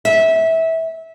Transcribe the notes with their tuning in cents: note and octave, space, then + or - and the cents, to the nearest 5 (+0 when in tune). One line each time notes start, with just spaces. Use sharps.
E5 -20